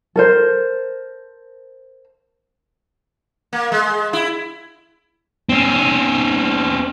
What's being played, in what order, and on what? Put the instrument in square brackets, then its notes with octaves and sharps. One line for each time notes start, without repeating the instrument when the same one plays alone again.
[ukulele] A4 A#4 C5
[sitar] A#3
G#3
E4
[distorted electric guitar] C4 C#4